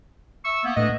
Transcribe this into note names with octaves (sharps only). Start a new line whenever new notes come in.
E5 C#6 E6
A#3 B3
A2 D4 B4 D#5